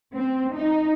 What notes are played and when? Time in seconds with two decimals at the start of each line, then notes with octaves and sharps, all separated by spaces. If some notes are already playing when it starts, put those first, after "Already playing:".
0.15 C4
0.56 D#4